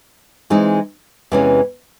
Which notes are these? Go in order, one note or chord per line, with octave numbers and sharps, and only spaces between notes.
E3 G#3 C4 D#4
E2 C3 E3 G#3 C#4